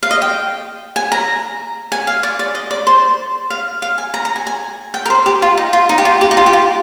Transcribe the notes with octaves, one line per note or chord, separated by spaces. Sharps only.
F5
D#5
G5
G#5
A#5
G#5
F5
D5
D5
D#5
D5
C5
F5
F5
G#5
A#5
A#5
G#5
G#5
G5
A#4
C5
G4
F4
D#4
F4
D#4
G4
F4
G4
D#4
F4
G4
F4